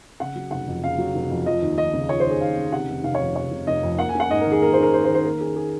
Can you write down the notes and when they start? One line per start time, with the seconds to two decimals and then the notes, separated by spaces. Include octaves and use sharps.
0.20 C#3 F#5
0.35 F#3
0.51 F1 F#5
0.67 F2
0.83 C#3 F5
0.98 F#3
1.15 F1
1.30 F2
1.46 F3 D#5
1.62 D#2
1.78 D#2 D#5
1.93 C#3
2.09 F3 C#5
2.20 C5
2.25 D#2
2.30 G#4
2.41 D#2 F5
2.56 C#3
2.72 C3 F#5
2.88 F1
3.04 F1 F5
3.15 C#5
3.20 F2
3.35 C3 C#5
3.51 F1
3.67 F1 D#5
3.83 F2
3.98 A#3 F#5
4.09 G#5
4.15 C#4
4.20 F#5
4.30 G#2 D#5
4.41 A#4
4.46 D#3
4.52 G#4
4.62 A#3 A#4
4.73 C5
4.78 C#4 A#4
4.93 G#2 C5
5.04 C5
5.09 D#3
5.14 C5
5.25 A#3 A#4
5.41 C#4 G#4
5.56 G#4